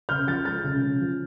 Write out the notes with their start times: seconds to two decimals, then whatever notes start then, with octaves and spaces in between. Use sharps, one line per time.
0.09 C#3 F6 G6
0.27 F3 G6 A6
0.45 G#3 G6 A6
0.64 C#3
0.82 C#3
1.01 F3